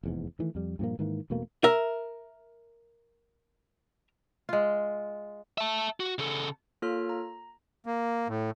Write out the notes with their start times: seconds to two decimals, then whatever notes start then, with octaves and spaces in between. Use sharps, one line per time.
0.03 F1 E2 G#2
0.39 D#3 E3 A3
0.55 F2 G3
0.79 G2 A#2 F3 A#3
0.99 G#2 D#3 E3 A#3
1.30 E1 B2 A3 A#3
1.64 A#4 E5
4.49 G#3 F4
5.58 E5 A5
6.00 F#4
6.19 C#3 A4
6.82 A#3 F4 A4 C#5 F6
7.09 A#5
7.86 A#3
8.28 A2